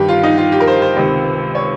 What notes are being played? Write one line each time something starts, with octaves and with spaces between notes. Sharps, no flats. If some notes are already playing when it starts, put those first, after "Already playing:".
Already playing: G2 D#3 G4
F4
D#4
F4
G4
A#4
C5
C5
C#2 C3 D#3
C#5